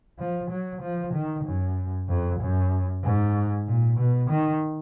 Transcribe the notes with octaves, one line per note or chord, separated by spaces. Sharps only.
F3
F#3
F3
D#3
F#2
F2
F#2
G#2
A#2
B2
D#3